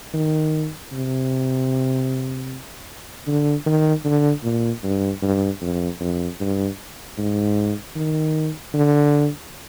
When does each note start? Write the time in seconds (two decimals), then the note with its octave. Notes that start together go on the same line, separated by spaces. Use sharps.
0.14 D#3
0.92 C3
3.27 D3
3.66 D#3
4.04 D3
4.43 A#2
4.83 G2
5.22 G2
5.61 F2
6.00 F2
6.40 G2
7.18 G#2
7.96 D#3
8.74 D3